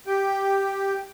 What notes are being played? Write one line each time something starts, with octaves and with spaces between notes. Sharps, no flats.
G4 G5